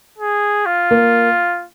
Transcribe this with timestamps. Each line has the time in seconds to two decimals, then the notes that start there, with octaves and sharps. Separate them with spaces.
0.18 G#4
0.66 F4
0.91 A#3